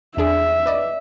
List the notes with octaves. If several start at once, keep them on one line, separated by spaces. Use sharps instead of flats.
E2 D4 G#4 E5
B4 D5 D#5